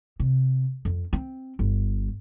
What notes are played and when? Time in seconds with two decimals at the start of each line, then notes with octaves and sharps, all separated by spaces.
0.20 C3
0.85 F2
1.13 C4
1.59 G1